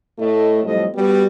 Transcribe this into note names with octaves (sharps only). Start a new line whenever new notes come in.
A2 A3 E4 D#5
F2 A2 F#3 G3 D#5
G3 B3 F#4 G4